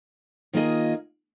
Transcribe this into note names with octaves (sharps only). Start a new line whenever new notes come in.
D#3 A#3 F4 G#4 D#5